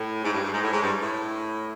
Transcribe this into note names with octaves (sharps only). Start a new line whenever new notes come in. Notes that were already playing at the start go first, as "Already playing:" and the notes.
Already playing: A2
G#2
G2
G2
G#2
A2
G#2
G2
A2